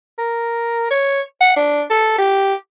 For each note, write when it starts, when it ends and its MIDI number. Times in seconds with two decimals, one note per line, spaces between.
0.19 0.90 70
0.91 1.21 73
1.41 1.54 78
1.56 1.82 62
1.90 2.16 69
2.18 2.54 67